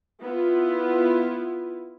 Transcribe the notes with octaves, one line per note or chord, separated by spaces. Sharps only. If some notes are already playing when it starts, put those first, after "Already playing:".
B3 E4 F4